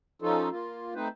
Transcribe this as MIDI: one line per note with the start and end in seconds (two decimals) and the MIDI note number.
0.22 0.49 53
0.22 0.49 61
0.22 0.49 63
0.22 0.49 65
0.22 0.49 69
0.50 0.94 58
0.50 0.94 65
0.95 1.08 57
0.95 1.08 60
0.95 1.08 63
0.95 1.08 71
0.95 1.08 72